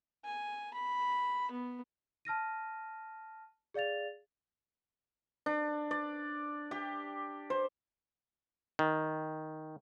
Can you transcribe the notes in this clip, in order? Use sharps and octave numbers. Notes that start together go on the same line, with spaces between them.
G#5
B5
B3
A5 F6 A#6 D#7
G#4 D5 F5 A6 F7
D4
D5
G4
C5
D#3